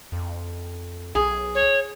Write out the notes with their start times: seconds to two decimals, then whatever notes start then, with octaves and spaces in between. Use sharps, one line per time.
0.12 F2
1.15 B1 G#4
1.55 C#5